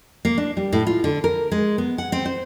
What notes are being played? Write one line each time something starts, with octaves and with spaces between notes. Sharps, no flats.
A#3
D4
G3
A2
F4
D3
A#4
G#3
B3
F#5
C4
C5